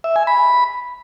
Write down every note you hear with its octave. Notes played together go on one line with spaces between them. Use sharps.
E5
G#5
B5